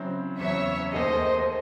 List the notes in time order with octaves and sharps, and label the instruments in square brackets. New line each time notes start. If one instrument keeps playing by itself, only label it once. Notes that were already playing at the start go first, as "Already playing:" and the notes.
Already playing: [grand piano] C#3 F#3 C4 E4
[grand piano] E2 C#3 F#3 [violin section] C#5 E5
[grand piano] D#2 D#3 A3 D#4 G#4 [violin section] C5 D#5